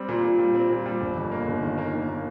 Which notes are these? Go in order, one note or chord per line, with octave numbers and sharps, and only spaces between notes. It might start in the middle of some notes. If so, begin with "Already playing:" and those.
Already playing: G3 C4
A#2
A#2
G3
C4
A#2
G3
G1
F2
A#3
G1
D#3
A#3
D#3
A#3